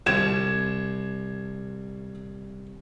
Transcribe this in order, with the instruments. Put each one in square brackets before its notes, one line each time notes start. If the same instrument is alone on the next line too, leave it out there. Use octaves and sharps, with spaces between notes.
[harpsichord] C2 [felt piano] G#6 E7